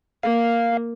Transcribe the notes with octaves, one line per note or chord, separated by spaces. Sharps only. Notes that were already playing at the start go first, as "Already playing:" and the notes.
A#3 F5